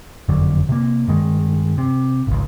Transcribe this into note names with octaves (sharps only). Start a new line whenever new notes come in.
F#1 F2 D3 F#3
C3 A#3
G2 D#3 G#3
C3
G#1 C#2